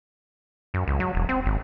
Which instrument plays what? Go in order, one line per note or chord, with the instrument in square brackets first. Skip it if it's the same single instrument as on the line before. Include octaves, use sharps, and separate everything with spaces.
[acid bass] F#2
C#2
F#3
E1
C4
G#1